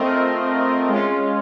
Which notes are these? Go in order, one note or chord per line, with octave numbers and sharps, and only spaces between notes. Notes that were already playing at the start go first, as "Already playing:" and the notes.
Already playing: A3 C4 F4 A#4 D#5
G#3 C#4 F4